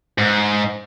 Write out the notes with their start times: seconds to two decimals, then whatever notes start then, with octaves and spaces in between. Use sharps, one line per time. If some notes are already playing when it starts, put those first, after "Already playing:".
0.18 G#2